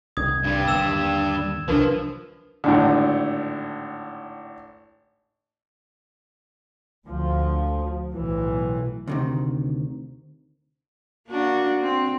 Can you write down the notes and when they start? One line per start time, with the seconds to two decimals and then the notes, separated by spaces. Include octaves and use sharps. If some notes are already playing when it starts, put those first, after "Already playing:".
0.17 C2 D#3 D#6 G#6
0.43 G2 G3
0.68 D#2 D3 A#3 E6 E7
1.68 C2 C3 F3 D4 A#4 B4
2.64 G#1 A2 D3
7.07 D2 F3
8.13 B1 A2 E3
9.07 D2 C3 D#3
11.28 A#3 D4 F#4
11.81 C4